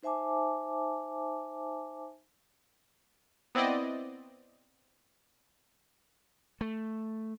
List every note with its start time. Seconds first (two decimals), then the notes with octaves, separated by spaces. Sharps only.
0.03 D#4 C5 E5 G#5 A5 D6
3.55 B3 C4 E4 D5 D#5
6.61 A3